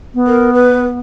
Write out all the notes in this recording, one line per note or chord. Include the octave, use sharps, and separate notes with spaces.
B3
A#4
B4